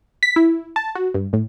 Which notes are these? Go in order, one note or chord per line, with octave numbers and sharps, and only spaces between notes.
B6
E4
A5
F#4
G2
A2